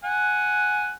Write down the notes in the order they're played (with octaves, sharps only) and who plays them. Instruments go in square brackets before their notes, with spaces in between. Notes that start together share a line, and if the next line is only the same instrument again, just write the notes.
[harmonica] F#5 G#5